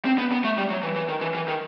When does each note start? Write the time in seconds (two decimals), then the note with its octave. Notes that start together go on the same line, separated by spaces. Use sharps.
0.05 C4
0.18 B3
0.32 B3
0.44 A3
0.58 G3
0.70 F#3
0.83 E3
0.96 E3
1.09 D#3
1.21 E3
1.35 E3
1.48 D#3